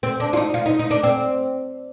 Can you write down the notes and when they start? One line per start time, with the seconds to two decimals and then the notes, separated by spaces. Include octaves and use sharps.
0.03 C4
0.20 D4
0.33 F4
0.37 D#4
0.54 F4
0.66 D#4
0.79 D#4
0.91 D4
1.03 C4